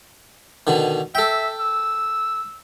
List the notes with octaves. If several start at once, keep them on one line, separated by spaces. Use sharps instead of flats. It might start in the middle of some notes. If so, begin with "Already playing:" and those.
B2 D3 D#3
A4 E5 G5
E6